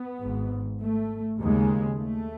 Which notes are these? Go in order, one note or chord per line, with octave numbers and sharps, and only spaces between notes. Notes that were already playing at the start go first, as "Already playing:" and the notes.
Already playing: B3
G#1 G#2
A3
D#2 C#3 G#3
A3